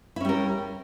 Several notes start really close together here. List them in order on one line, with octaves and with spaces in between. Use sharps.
E4 C#4 G3 A#4